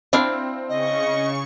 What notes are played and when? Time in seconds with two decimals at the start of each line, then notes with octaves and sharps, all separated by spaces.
0.13 C4 D4 E4 F5
0.68 C#3 D#5 C#6